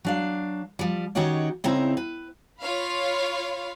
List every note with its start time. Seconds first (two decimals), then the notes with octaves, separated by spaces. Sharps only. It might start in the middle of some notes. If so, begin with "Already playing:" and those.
0.05 F#3 D4 F5
0.79 F3 G3
1.15 D#3 C#4 D#4 F#4 G4 C#5
1.64 C#3 C4 D#4 E4 A#5
1.97 B4
2.61 F4 C#5 F5 B5